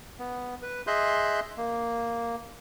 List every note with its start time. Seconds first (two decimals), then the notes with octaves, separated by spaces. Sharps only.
0.19 B3
0.63 B4
0.87 G#4 D#5 E5 C6 F#6 G6
1.57 A#3